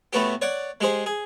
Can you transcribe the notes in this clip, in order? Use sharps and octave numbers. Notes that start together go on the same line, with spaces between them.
A2 A3 B3 F#4 G4
C#5 D5 F#5
G#3 G4 G#4 C5
G#4